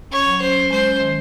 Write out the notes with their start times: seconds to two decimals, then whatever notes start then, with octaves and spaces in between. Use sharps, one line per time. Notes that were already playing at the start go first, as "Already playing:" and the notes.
0.11 C#4 C#5
0.26 F#3
0.41 C#4 C5
0.56 C#4
0.70 G#3 C5
0.85 C#4
1.00 D#3